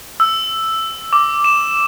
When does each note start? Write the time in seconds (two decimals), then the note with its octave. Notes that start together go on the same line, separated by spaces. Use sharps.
0.20 E6
1.13 D6
1.44 E7